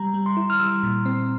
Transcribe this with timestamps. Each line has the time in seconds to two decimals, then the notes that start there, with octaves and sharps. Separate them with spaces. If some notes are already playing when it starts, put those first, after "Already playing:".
Already playing: G3 A#5
0.14 G3
0.26 C6
0.37 E4
0.50 F6
0.60 G3 E6
0.83 A#2
1.06 C4